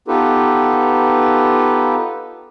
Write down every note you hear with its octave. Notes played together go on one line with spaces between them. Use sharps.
B3 D#4 F4 G4 A4 B4